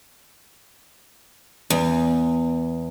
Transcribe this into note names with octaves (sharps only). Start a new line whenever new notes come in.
E2